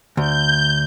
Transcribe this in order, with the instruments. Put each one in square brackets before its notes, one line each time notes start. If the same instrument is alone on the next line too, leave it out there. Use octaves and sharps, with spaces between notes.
[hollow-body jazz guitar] D2 [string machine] G6